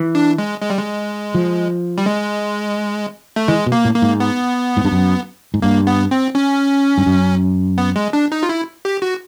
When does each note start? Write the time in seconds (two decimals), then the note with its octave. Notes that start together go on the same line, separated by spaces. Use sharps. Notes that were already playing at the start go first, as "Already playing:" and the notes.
Already playing: E3
0.15 D4
0.38 G#3
0.62 G#3
0.70 G3
0.79 G#3
1.35 F3
1.98 G3
2.06 G#3
3.36 A3
3.48 E3 G#3
3.67 B2
3.72 A#3
3.85 A2
3.96 A#3
4.02 G#2
4.20 B3
4.77 G#2
4.85 G2
4.92 F#2
5.54 G#2
5.62 G2 A#3
5.87 B3
6.11 C4
6.35 C#4
6.98 G2
7.06 F#2
7.78 B3
7.96 G#3
8.13 D4
8.32 D#4
8.43 F4
8.49 E4
8.85 G4
9.02 F#4